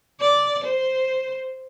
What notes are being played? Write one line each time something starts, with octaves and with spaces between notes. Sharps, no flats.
D5
C5